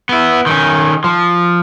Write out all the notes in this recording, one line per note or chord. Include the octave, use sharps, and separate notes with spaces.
B3 E4
D#3 C#4
F3